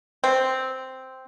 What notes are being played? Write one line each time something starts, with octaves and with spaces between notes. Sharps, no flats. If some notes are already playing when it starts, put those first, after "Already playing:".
C4